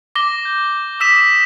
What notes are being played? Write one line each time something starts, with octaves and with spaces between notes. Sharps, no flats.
D6 A#6 G7
G6
D#6 E6 B6 E7